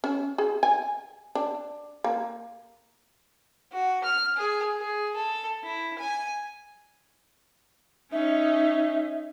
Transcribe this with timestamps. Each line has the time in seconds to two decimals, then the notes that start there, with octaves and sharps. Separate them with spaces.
0.04 C#4
0.38 G#4
0.63 G#5
1.35 D4
2.04 A#3
3.73 F#4
4.04 F6
4.37 G#4
4.78 G#4
5.16 A4
5.64 E4
5.99 G#5
8.12 C#4 D#4 E5